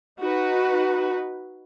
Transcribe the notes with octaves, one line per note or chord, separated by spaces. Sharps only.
D#4 F#4 B4